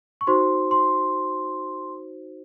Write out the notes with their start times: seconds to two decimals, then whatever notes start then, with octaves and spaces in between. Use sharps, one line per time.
0.21 C#6
0.27 D#4 F#4 C5 C6
0.71 C6